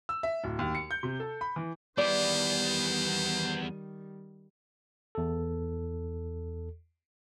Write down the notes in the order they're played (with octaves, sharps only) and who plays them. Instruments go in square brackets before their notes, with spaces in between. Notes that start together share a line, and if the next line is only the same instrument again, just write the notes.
[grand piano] E6
E5
D1
D#2
C#7
G6
C3
A4
B5
E3
[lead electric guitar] E2 B3 [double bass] D#3 G3 [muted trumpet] C5 [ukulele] D5
[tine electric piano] E2 A4